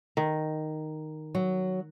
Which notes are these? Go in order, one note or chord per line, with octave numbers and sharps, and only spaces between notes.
D#3
F#3